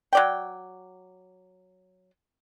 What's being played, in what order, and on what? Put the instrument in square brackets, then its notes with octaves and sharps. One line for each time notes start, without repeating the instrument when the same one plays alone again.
[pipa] F#3 D5 G5